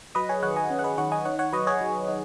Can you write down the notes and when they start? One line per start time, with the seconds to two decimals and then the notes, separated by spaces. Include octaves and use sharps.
0.15 F#3 B4 D#5
0.29 G#4 C#5
0.43 D#3 C#5 F#5
0.56 D#5 G#5
0.70 C#4
0.79 F#5
0.84 B4 D#5
0.98 D#3 C#5 F#5
1.12 D#5 G#5
1.25 D#4 C#5 F#5
1.39 C#5 F#5
1.53 F#3 B4 D#5
1.67 G#4 C#5
1.81 F#3
2.08 D#4